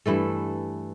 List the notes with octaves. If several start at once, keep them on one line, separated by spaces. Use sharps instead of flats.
G2 E3 A3 A4